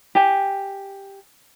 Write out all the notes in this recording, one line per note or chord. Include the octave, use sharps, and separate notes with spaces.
G4 G#5